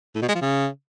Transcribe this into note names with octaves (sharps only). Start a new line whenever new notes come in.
A2
B2
G#3
F3
C#3